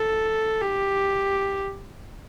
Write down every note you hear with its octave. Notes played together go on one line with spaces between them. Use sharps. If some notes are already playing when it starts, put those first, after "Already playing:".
Already playing: A4
G4